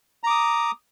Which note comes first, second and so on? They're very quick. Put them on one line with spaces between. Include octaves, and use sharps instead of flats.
A#5 D6 D#6